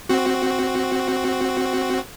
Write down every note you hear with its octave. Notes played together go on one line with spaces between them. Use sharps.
C4 F#4